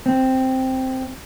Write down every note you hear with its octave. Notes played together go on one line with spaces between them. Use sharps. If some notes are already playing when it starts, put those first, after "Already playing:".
C4